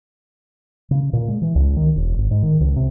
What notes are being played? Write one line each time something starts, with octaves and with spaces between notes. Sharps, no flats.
C#3
A#2
G#3
E3
C#2
D#3
E1
G#1
G#2
D#3
C#2
C3